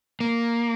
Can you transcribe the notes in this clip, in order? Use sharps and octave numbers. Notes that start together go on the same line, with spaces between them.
A#3